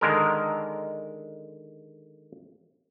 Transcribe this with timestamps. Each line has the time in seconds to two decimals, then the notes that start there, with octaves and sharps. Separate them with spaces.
0.01 D3 D#3 G#3 A#4